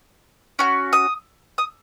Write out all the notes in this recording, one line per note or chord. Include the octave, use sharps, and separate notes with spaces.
C#4 F#4
D#6
D#6